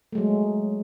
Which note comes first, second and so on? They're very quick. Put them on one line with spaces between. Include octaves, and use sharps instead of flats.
A3 G#3 F#3